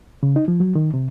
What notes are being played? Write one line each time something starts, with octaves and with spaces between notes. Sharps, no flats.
C#3
D#4
F3
F#3
D#3
C3